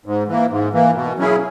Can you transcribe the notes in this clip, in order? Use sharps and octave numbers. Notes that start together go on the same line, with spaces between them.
G#2
E3 A#3
G#2
E3 A#3
B2
F#3 C#4 E4 G#4